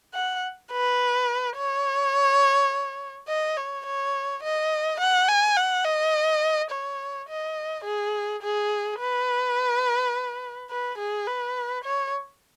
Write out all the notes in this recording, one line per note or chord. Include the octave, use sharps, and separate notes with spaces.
F#5
B4
C#5
D#5
C#5
C#5
D#5
F#5
G#5
F#5
D#5
C#5
D#5
G#4
G#4
B4
B4
G#4
B4
C#5